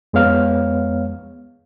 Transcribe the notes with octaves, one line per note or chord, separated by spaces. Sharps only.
F2 G#3 B3 C#5 F5 F6